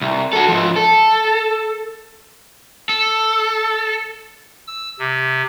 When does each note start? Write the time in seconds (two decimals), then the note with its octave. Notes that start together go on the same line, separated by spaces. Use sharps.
0.01 C2
0.33 F#4 A4
0.48 G#2 F3
0.76 A4
2.89 A4
4.67 E6
4.99 C3